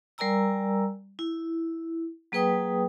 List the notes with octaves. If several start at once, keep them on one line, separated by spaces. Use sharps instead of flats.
G3 A#4 D5 G#5 A#5 E6
E4
F#3 A#3 G#4 B4 G5 D#6